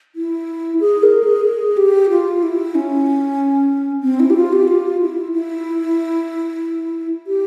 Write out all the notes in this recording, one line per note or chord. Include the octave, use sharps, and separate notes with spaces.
E4
G#4
A#4
G#4
G#4
G4
F4
E4
C#4
C4
E4
G4
F4
G4
F4
E4
E4
G4